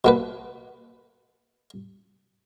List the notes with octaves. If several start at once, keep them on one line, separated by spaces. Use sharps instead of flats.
B2 A#3 B4